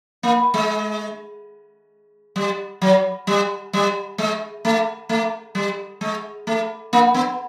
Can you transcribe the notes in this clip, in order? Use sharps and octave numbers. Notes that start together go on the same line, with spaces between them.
A#3
G#3
G3
F#3
G3
G3
G#3
A3
A3
G3
G#3
A3
A#3
B3